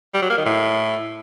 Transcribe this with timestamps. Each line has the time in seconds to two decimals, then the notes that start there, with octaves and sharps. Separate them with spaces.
0.14 G3
0.22 F#3
0.30 A#3
0.38 D#3
0.46 A2